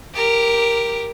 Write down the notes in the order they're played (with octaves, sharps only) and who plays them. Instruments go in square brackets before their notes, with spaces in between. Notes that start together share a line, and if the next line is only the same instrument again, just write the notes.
[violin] G4 A#4